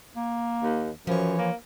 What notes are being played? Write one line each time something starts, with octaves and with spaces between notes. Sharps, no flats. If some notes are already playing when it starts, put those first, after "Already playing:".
A#3
D#2
F#2 E3 F3 C#5
A#3